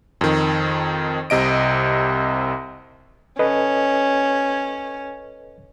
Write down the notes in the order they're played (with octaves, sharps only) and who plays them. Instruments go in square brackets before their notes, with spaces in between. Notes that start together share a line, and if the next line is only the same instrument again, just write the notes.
[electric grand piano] F2 D#3
C2 C3 D#5 D7
[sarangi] C#4 [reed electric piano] A4 B4 D#5